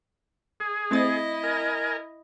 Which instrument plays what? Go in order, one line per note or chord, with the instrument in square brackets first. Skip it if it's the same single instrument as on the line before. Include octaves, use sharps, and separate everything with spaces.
[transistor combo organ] G#4
[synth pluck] A3 C4 A6 [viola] E4 D#5
[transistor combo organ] A#4 G#5